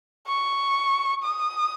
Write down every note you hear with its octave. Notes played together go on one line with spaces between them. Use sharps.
C#6
D#6